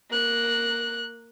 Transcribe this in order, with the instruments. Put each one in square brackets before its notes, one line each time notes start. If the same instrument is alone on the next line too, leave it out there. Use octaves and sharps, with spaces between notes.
[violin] A#3 F#6